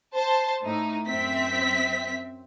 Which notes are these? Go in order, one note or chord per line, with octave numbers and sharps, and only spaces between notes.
C5 A5
A2 D#4
F#2 C4 E5 B6